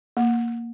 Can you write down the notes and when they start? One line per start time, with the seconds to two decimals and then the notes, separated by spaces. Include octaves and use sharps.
0.17 A#3